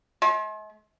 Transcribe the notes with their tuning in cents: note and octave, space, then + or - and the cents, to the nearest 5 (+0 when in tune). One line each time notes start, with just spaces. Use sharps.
G#3 +45